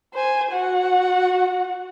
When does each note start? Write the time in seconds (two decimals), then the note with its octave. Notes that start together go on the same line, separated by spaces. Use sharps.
0.14 C5 G#5
0.52 F#4 F#5